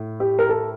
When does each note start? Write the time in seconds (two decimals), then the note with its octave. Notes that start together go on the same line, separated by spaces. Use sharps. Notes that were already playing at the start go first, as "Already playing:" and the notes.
Already playing: A2
0.20 G4
0.39 A#4
0.49 A4